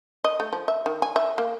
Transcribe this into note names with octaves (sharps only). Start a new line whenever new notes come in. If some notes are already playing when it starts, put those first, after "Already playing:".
D#5
A3
F3
E5
D#3
G#5
E5
A#3